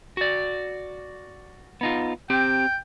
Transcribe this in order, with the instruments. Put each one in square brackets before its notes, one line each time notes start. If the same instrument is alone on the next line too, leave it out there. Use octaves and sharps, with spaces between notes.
[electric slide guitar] F#4 D5
B3 D#4 F4
[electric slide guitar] C4 G4 [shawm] G5